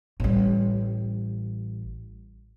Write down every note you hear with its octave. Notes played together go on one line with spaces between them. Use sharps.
A1 G3